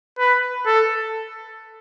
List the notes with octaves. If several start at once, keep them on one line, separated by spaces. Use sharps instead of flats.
B4
A4